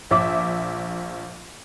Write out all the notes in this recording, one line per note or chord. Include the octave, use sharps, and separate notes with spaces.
A#1 E5 D6